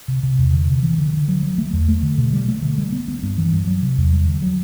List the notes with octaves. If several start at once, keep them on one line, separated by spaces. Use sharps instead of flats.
C3
C3
E2
D3
C3
E3
D3
D3
F#3
F#3
A3
E2
A3
D3
B2
G3
A3
D3
G3
B3
B3
G2
E3
G2
F#3
C3
E2
G3
D3
F#3